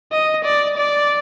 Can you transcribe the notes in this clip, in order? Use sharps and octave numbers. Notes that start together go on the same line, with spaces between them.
D#5
D5
D5